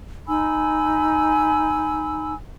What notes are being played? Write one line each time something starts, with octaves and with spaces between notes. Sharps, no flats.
D#4 G#5 B5 E6